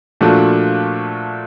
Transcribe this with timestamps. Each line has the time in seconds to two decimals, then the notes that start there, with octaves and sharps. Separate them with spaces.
0.21 A#2 F3 A3 D4 F#4